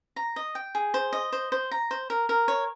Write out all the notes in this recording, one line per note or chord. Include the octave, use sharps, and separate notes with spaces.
A#5
D#5
G5
G#4
C5
D#5
C5
C5
A#5
C5
A#4
A#4
C#5